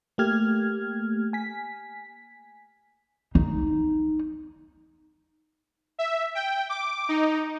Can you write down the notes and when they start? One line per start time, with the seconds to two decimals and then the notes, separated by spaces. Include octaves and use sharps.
0.18 A3 A#3 G4 F6 G#6
1.33 G#5 B6
3.35 D#4
5.99 E5
6.35 G5
6.69 D6
7.09 D#4